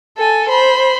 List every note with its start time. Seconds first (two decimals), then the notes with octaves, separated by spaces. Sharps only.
0.17 A4 G#5
0.48 C5 B5